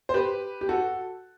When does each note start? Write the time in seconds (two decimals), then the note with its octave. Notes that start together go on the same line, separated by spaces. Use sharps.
0.09 C5
0.14 G4 B4
0.61 G4
0.69 F#4 A4